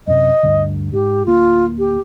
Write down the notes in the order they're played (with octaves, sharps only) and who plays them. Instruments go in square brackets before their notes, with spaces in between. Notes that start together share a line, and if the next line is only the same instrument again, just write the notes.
[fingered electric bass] F#2 C3 [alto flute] D#5
[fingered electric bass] D2 G2 D3
[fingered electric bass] G#2 [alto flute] G4
[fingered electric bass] D1 A#3 [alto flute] F4
[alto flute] G4